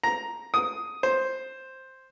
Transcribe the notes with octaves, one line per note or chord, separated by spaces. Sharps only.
A#5
D#6
C5